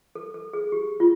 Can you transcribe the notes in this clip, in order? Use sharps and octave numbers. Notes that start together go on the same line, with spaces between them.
A4
A4
G#4
G4
F4